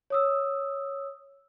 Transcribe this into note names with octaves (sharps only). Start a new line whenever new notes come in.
C#5 D#6 E6